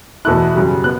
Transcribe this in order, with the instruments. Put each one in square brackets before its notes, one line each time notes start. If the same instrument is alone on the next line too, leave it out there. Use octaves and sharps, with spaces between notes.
[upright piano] E2 B2 A3 E4 F#6
F#2 C#3 G3
B3 F#6